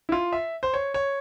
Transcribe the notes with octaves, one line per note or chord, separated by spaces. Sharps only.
E4
F4
E5
C5
C#5
C#5